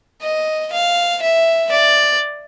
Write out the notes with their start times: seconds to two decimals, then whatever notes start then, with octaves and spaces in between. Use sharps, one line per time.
0.22 D#5
0.72 F5
1.22 E5
1.71 D5